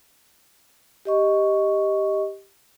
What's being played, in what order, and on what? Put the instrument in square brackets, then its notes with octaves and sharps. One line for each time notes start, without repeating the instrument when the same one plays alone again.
[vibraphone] G4 D#5 C#6